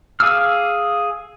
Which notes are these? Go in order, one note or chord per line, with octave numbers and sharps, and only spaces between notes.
G#4 F5 D6 E6 F6